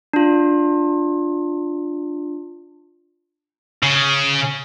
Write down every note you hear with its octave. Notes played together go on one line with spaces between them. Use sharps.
D4 F4
C#3